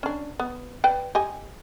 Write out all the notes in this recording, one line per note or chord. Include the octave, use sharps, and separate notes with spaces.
C#4 D4
B3
B4 D5 G5
G4 D#5 G#5